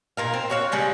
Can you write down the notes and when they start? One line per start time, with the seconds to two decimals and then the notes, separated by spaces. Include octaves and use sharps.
0.17 A#2 A#4 F5
0.34 C4
0.50 F#4 C#5 F5
0.72 C#3 G3 G#3 C#4